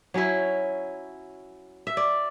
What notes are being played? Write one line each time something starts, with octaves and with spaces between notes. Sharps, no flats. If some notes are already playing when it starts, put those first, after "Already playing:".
F#3 C#4 E4
E5
D5